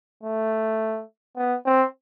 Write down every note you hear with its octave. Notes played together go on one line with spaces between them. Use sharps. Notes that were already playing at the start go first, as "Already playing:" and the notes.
A3
B3
C4